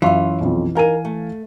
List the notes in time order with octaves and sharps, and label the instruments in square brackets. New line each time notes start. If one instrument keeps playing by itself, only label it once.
[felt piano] F#2 E5 C6 [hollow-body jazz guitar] E3 [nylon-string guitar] C#4 F4
[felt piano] B1 F2
[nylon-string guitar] D#4 A#4 [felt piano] F5 G#5 D#7
[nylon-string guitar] A3